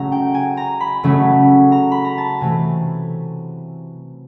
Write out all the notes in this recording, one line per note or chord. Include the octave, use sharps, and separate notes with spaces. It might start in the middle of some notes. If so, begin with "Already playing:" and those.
Already playing: C#3 F#3 A3 C#4 A#5
G5
G#5
A#5
B5
C#3 F#3 A3 C#4
A#5
B5
A#5
A5
C3 E3 A3 G#5